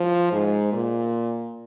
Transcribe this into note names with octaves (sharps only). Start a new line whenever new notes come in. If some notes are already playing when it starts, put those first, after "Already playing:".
Already playing: F3
G#2
A#2